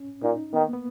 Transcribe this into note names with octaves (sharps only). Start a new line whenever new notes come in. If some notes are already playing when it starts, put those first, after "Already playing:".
Already playing: C#4
A#2 D#4
D#3 B3
A#3
B3